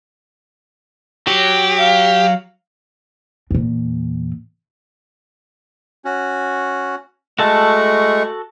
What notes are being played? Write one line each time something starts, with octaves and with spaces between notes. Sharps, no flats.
F#3 G4
F5
E2 A#2
C#4 F#4
G#3 A3 F#4 A4 A5 C#6